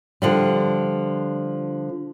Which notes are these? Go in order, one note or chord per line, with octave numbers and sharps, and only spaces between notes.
D3 F3 G3